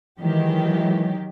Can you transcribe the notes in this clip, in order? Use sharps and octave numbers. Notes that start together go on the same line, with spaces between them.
D#3 E3 F#3 G#3 G4